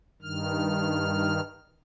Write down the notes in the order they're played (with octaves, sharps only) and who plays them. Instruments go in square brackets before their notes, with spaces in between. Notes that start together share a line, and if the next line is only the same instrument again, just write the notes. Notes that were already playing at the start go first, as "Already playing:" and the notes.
[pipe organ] G2 D#3 F6